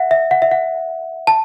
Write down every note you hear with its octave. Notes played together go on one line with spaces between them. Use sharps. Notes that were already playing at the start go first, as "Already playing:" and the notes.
Already playing: E5 F#5
E5
F#5
E5
F#5
A5